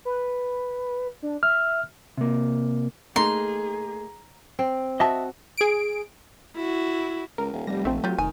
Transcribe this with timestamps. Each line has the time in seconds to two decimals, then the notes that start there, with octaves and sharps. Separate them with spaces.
0.05 B4
1.23 D4
1.43 E5 F6
2.18 C3 A#3
3.16 A3 A#3 D#4 G#4 A#5 C6
4.59 C4
5.00 F#4 D#5 E5 A5
5.58 G#4 D7
6.56 E4 F#4
7.38 C#2 A#4
7.53 D#1
7.67 F1 G3 A#6
7.85 A#1 A3 C4
8.04 F#3 F4 G4
8.18 F1 D#3 G#5